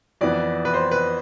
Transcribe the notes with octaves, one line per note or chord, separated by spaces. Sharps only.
F2 E3 B3 D5
B4
C5
B4